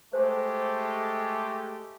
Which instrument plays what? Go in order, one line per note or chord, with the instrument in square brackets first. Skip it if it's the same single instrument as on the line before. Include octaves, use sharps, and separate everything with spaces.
[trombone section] G#3 A3 G4 [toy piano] C5